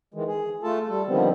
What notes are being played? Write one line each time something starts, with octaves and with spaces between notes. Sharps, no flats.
D#3 E3 G#3
G#4
A3 F4 A4 A5
G3 A4
D3 D#3 F3 G3 B3 C4